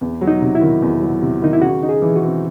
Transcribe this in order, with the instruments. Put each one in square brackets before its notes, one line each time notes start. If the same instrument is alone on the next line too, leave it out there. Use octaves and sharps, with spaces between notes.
[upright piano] E2
F#3
[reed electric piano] D#4
[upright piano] C3
[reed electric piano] E4
[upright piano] D#3
E2
F#3
C3
[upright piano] D#3 [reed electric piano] D#4
[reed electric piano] E4
[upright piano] C#3 [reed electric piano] F#4
[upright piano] D#4
[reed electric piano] G#4
[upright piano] E3
[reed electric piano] F#4
[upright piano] C4